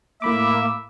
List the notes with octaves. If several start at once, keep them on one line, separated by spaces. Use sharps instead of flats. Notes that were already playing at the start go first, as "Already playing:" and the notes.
A2 A#3 E5 B5 D6